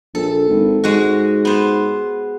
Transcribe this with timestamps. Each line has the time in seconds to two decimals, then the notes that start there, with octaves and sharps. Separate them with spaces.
0.15 A#1 A4
0.49 G#1
0.84 G#2 G#3 F#4
1.45 B3 C5